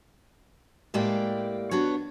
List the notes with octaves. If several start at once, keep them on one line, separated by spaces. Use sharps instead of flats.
A2 G#3 A#3 G4 D5 G5
B3 D4 F#4 C#5